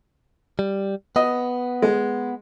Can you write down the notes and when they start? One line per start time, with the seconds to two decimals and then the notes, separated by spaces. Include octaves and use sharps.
0.59 G3
1.16 B3 D#5
1.82 G#3